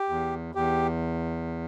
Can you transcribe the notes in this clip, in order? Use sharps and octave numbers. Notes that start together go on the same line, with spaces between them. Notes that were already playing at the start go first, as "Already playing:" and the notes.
Already playing: G4
E2
E2 G4